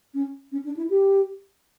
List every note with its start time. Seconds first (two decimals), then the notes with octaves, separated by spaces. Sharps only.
0.14 C#4
0.52 C#4
0.65 D4
0.77 E4
0.90 G4